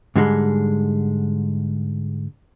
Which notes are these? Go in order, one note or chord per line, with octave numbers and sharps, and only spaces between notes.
G#2 D3 G3 G#3